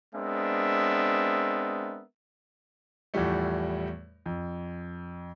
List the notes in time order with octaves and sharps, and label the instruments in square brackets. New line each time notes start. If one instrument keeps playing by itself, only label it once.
[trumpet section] G#3 B3 C4 D4 A#4 E5
[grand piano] E2 A2 F3 G3 A3
F2